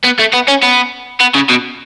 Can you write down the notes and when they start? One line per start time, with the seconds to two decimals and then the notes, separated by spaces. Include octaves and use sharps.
0.04 B3
0.19 A3
0.33 B3
0.48 C#4
0.62 B3
1.20 B3
1.35 C#3
1.49 B2